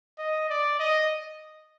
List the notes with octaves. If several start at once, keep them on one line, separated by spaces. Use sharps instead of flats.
D#5
D5
D#5